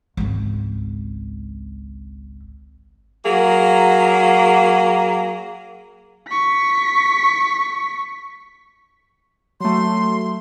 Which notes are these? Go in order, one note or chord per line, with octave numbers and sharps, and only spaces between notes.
G#1 C#2
F#3 A#3 G#4
C#6 B6
F#3 A3 C6